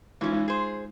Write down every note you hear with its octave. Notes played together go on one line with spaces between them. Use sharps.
E3 G#3 C#4 D#4 F4
G#3 D#4
G#4 C5